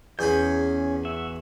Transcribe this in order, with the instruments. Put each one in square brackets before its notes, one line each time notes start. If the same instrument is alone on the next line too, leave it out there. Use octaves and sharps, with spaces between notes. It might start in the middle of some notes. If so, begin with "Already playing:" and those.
[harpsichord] E2 G#4 B5 [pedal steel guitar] C#4 G6
[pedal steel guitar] F#4 E5